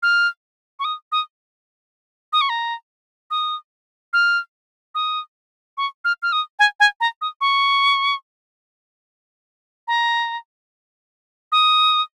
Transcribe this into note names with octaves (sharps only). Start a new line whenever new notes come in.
F6
C#6
D#6
D#6
D#6
C#6
A#5
D#6
F6
D#6
C#6
F6
F6
D#6
G#5
G#5
A#5
D#6
C#6
A#5
D#6